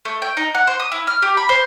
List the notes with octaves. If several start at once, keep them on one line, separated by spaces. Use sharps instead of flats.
A3
G5
D#4
F#5
C5
D#6
E4
F6
G4
B5
C5